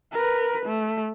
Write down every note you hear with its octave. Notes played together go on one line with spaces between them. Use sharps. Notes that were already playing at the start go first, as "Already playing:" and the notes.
A#4 B4
A3